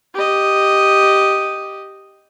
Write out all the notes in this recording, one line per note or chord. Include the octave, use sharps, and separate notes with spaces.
G4 D#5